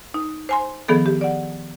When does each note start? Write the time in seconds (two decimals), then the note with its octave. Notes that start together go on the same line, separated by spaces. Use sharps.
0.14 D#4
0.49 C5 G#5 C6
0.88 D#3 F3 B3 G#4 A4
1.06 G4
1.21 D5 F#5